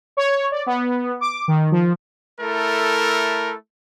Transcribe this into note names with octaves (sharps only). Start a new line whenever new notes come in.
C#5
D5
B3
D6
D#3
F3
A3 E4 A4 A#4